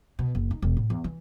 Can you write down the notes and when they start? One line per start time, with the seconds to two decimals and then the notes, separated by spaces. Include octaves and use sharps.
0.19 B2
0.35 F#1
0.51 D#4
0.62 E1
0.77 A2
0.90 E2
1.04 E3